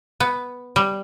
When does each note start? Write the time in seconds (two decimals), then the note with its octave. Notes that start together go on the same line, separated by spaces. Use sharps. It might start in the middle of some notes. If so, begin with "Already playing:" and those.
0.20 B3
0.76 G3